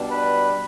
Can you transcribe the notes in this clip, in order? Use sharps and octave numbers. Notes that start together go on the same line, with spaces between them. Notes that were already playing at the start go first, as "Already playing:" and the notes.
Already playing: B2 G3 D4
B4